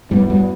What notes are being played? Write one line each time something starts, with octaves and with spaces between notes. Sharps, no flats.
G2 F#3 G3 B3 E4
G2 G3